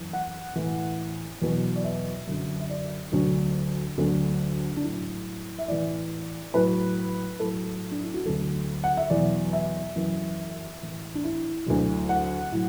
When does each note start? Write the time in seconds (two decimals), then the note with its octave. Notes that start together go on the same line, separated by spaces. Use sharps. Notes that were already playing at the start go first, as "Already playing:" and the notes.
Already playing: F#2 E3
0.13 F#5
0.56 A2 E3
1.42 E2 B2 F#3
1.76 D5
1.84 E5
2.27 F#2 D3 F#3
2.60 E5
2.70 D5
3.12 D2 D3 F#3 D4
3.98 D2 D3 F#3
4.77 D4
4.83 A2 F#3 E4
5.59 E5
5.68 A2 E3 D5
6.53 A2 F#3 B4
7.39 A2 F#3 A4
7.92 D4
8.02 E4
8.14 F#4
8.25 D2 D3 F#3 A4
8.84 F#5
8.97 E5
9.10 E2 B2 F#3 D5
9.53 E5
9.95 F#2 E3
10.81 A2 E3
11.15 D4
11.24 E4
11.66 D2 D3 F#3
12.09 F#5
12.52 A2 F#3